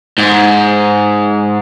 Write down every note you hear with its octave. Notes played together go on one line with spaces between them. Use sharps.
G#2